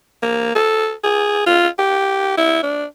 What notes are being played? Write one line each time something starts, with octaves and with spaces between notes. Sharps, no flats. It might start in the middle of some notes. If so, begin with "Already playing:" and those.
A#3
A4
G#4
F4
G4
E4
D4